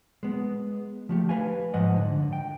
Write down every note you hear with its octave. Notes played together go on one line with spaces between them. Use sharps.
G#3 B3
F3 A3 G4
B4 F5 G#5
G#2 F3 D#5 F#5
D3
G5